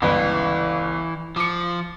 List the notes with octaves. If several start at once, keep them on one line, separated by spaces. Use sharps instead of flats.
G1 C#2 E3 B4
F3 D6 C#7